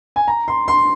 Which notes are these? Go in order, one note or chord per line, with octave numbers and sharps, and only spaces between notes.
G#5
A#5
C6
C6